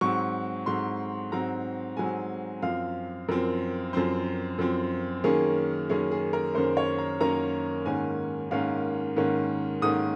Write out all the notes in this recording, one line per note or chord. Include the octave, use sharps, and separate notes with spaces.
G#2 F#3 C4 C#6
G#2 F#3 C4 C6
G#2 F#3 C4 A#5
G#2 F#3 C4 G#5
F#2 F3 C4 F5
F#2 F3 C4 A#4
F#2 F3 C4 C5
F#2 F3 C4
F#2 D#3 A#3 C#4 G#4
F#2 D#3 A#3 C#4 G#4
G#4
A#4
F#2 D#3 A#3 C#4 C5
C#5
A#5
F#2 D#3 A#3 C#4 A#5
G#2 D#3 A#3 C#4 G#5
G#2 D#3 A#3 C#4 F5
G#2 D#3 A#3 C#4
G#2 D#3 A#3 C#4 D#6